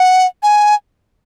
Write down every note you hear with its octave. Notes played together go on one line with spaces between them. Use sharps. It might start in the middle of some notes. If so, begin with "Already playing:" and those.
Already playing: F#5
G#5